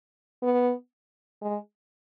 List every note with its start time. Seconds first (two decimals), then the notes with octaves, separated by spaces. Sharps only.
0.43 B3
1.41 G#3